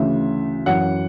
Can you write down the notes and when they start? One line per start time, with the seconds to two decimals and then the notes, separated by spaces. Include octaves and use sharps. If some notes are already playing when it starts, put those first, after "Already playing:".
Already playing: D2 C#3 E3 E5
0.66 F#2 E3 F#5